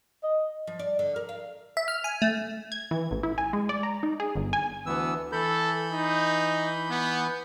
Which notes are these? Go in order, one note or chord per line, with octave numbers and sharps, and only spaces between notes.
D#5
F3
D5
D3
A#4
F5
E5
F6
G#5
A3
G#6
E3
A1
E4
G#5
G#3
D5
A#5
D#4
G#4
G1
G#5
D2 E3 B3 E6
E3 A4 B5 G6
D#4
B3